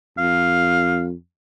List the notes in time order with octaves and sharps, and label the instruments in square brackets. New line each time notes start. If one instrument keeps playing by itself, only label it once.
[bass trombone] F2 [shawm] F5